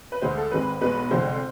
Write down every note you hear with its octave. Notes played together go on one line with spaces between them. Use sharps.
B4
D2 D3 G#3 C5
A4
G#1 G#2 G#3 C4 B4
B1 B2 G#3 B3 B4
F1 F2 D3 G#3 C5